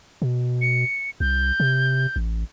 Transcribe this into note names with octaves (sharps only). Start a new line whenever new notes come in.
B2
C#7
C2 G6
C3
A1